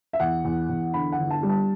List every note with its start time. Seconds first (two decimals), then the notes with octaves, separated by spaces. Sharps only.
0.13 E5
0.20 E2 F#5
0.45 E2
0.69 E2
0.94 D3 B5
1.12 F#5
1.18 G1
1.31 A5
1.43 G3
1.49 A5